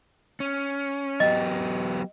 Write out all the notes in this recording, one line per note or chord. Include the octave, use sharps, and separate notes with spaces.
C#4
F#3 B3 G4 D#5